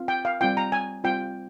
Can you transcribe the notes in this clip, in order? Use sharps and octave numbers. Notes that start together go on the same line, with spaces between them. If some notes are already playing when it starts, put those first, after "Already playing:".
Already playing: C4 F4
G5
F5
G3 C4 F4 G5
A#5
G#5
G3 C4 F4 G5